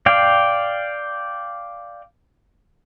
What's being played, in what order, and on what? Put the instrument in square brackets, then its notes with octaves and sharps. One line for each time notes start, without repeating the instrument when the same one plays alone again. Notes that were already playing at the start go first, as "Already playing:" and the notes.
[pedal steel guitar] D5 F5 G5